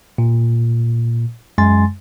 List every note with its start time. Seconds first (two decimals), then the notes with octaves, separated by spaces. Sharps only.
0.18 A#2
1.58 F#2 G#3 G#5 C6 A6